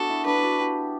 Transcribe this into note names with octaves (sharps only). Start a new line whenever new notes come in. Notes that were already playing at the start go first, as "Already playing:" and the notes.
Already playing: B3 D4 F#4 A4
E4
D4 B4
E4
F#4
G4